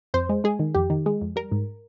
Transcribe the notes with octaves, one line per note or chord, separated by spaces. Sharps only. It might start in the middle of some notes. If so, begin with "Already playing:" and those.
F2 C5
G#3
G#3 G#4
D#3
F2 G4
D#3
G#3
F2
G3 A#4
G#2